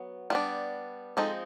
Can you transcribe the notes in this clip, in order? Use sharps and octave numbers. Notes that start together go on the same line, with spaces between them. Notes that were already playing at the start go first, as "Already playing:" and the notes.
Already playing: F#3 B3
G3 B3 D4 F4
F3 G#3 C4 D#4 A4